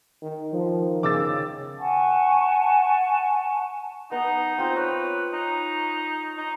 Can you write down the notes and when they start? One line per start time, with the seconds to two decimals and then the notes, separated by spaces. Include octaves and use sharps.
0.23 D#3
0.52 D#3 F3
1.03 C#3 D6 E6 A6
1.78 F#5 G#5 A5 C#6
4.12 B3 D#4
4.58 C4 F4 C5
4.76 B4 C#5
5.33 D#4
6.37 D#4